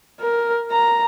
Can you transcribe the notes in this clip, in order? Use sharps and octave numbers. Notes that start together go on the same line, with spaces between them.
A#4
A#5